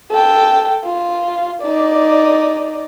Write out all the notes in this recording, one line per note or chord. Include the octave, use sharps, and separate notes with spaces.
A4 G5
F4
D#4 D5